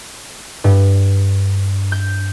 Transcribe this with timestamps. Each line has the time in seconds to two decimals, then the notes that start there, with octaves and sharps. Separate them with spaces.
0.64 G2
1.92 G6